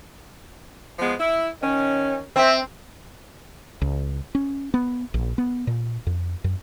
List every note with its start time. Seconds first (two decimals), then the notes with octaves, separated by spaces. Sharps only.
0.99 F3 G#3 B3
1.18 E4
1.62 D#3 C#4
2.36 C4 E5
3.82 C#2
4.35 C#4
4.74 B3
5.14 A#1
5.38 B3
5.67 A#2
6.07 F2
6.44 F#2